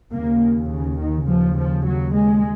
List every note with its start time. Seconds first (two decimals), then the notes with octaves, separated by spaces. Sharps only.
0.13 D#2 C#3 A#3
0.70 C#3
0.99 D#3
1.28 D#2 C#3 F3
1.57 F3
1.86 F#3
2.14 G#3